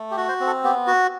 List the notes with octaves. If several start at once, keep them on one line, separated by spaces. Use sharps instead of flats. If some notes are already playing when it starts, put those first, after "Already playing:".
Already playing: A3
G4
F#4
C5
C4
A4
B3 G4
F#4